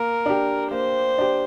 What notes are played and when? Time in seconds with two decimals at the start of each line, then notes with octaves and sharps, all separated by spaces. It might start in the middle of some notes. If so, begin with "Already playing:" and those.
Already playing: A#3 A#4
0.26 D4 G4
0.71 A#3 C5
1.18 D4 G4